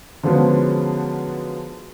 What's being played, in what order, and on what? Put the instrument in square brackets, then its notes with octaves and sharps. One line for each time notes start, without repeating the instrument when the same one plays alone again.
[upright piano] D3 F3 F#3 G#3 B3 C#4